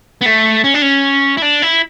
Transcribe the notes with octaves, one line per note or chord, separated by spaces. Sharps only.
B3
A3
C#4
D4
C#4
E4
D4
E4